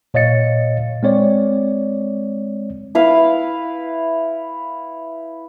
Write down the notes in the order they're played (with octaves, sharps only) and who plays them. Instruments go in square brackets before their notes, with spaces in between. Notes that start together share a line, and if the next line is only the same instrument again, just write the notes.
[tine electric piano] A#2 C#5 D#5 F5 A6 C#7
G#3 C4 C#5 D5
[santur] E4 B4 F5